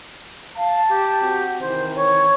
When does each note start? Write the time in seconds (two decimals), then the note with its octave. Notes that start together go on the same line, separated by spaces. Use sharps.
0.56 F5 A5
0.89 G4
1.21 C4 F#4
1.60 C3 D#3 E3 C5
1.96 C#5